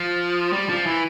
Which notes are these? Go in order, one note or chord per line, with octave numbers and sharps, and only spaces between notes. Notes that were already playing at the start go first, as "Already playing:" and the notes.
Already playing: F3
G3
F3
E3